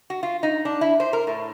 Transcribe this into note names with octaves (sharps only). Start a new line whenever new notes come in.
F#4
F4
D#4
D4
E4
C5
A#4
A2